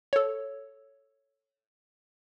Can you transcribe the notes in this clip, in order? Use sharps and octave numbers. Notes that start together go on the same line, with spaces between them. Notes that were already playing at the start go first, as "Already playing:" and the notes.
A4 C#5